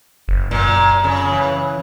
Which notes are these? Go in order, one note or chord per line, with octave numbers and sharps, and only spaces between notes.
F#1
F#2 A#2
C#3
E3